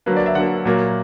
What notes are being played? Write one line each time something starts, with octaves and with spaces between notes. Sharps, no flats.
D3 F#3 A#3 B4
D5
E5
D3 F#3 A#3 F#5
A#2 F#3 A#3